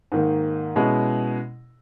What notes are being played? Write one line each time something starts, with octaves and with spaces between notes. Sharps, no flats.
G#2 D#3 A#3
B2 G#3 C#4 E4